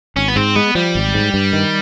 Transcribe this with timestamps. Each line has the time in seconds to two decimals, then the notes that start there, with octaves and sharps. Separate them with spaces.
0.16 G#1 C#4
0.28 B3
0.36 G#2 C4
0.56 G#3 B3
0.75 F3 G3
0.95 G#1
1.14 G#2
1.34 G2
1.53 D#3